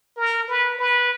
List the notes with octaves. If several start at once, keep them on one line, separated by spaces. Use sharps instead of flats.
A#4
B4
B4